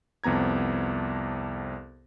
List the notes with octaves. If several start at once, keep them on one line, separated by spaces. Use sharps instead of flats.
C2 F2 B3 A#5 G#6